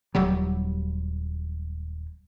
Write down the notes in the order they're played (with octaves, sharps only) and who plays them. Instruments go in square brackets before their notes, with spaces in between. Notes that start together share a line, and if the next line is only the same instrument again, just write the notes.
[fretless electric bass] D#1 F#3 G3